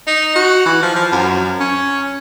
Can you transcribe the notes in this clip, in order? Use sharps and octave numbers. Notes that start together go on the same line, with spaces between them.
D#4
F#4
E3
F3
F3
F#2
C#4